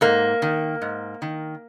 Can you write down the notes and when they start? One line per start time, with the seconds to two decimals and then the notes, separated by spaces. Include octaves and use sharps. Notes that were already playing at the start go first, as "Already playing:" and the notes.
0.01 G#2 A#3
0.42 D#3
0.82 G#2
1.22 D#3